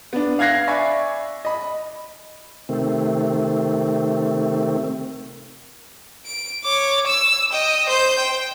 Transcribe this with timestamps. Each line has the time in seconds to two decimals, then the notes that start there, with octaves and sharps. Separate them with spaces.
0.13 B3 D4
0.39 F5 F#6 G#6 A#6 C7
0.67 D5 E5 G#5 B5 C#6
1.45 D#5 B5
2.69 C3 D#3 A3 C4
6.26 D7
6.64 C#5 D6
7.07 E6 E7
7.52 D#5 G5
7.89 C5 G6
8.19 G5